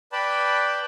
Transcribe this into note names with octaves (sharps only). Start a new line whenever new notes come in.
B4 D5 G5 A5 B5